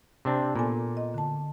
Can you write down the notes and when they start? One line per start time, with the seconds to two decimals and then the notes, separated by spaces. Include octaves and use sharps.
0.25 C3 C4 D4
0.56 A#2 B3 A4 G#5
0.97 D#5
1.14 D3 A5